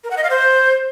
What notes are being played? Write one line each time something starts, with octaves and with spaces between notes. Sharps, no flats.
A#4
F#5
D#5
F5
C5